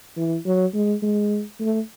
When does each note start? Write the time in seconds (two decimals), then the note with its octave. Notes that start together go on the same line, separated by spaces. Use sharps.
0.16 E3
0.45 F#3
0.74 G#3
1.02 G#3
1.60 A3